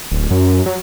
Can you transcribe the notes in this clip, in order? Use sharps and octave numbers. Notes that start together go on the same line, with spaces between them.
D1
F#2
F#3